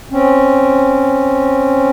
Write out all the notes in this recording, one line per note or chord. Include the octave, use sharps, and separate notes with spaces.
C4 C#4